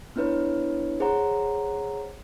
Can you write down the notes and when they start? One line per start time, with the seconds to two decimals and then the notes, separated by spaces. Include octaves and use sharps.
0.16 B3 D4 E4 B4 C#5
1.00 G#4 C5 C#5 F#5 A#5